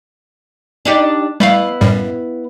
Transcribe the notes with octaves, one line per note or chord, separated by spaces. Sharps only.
D4 D#4 G4
G3 A3 B3 E4 F5
F#2 A2 G3